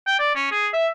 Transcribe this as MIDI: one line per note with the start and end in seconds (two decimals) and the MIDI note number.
0.07 0.17 79
0.19 0.32 74
0.35 0.49 61
0.52 0.68 68
0.73 0.87 76